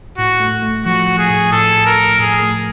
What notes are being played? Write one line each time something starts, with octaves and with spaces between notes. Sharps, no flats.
A2 F#4
A3
A3
F3 F#4
F3
G#4
A2
A2 A4
A2
A#4
A2
A2 G#4
A3